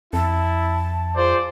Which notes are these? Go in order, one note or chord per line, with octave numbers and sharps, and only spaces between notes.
F2 E4 A5
F4 G#4 C5 D5